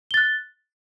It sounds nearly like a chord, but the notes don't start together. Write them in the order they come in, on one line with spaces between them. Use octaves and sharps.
G7 A6 F#6